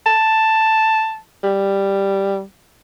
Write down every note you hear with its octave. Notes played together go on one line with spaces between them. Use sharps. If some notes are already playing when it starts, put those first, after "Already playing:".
A5
G3